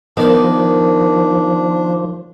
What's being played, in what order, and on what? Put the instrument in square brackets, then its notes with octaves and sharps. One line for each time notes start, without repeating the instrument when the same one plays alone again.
[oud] D#3 [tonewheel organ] F3 [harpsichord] B3 D5 [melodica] D4